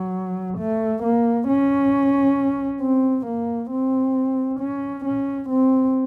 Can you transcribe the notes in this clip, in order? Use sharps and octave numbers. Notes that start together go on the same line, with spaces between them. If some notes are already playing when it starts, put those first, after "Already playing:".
Already playing: F#3
A3
A#3
C#4
C4
A#3
C4
C#4
C#4
C4